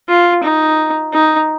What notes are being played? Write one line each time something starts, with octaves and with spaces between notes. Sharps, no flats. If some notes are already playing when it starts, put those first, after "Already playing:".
F4
D#4
D#4